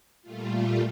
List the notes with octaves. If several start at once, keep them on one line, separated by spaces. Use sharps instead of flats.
A#2 G3 A3 F4